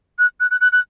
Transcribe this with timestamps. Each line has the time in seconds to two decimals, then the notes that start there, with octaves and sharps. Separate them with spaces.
0.19 F#6
0.40 F#6
0.51 F#6
0.61 F#6
0.72 F#6